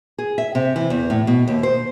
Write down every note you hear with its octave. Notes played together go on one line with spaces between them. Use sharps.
G#4
E5
C3
E3
E2
A2
B2
D#2
C5